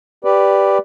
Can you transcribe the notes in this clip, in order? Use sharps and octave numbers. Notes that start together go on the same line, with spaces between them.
G4 B4 D5